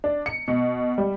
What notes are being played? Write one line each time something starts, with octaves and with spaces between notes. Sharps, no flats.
D4
C#7
B2
G3